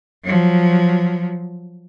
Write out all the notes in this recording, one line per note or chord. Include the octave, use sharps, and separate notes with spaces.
F3 F#3